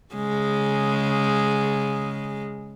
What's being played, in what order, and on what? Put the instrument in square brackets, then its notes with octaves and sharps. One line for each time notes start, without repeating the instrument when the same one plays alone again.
[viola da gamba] C#3 G#3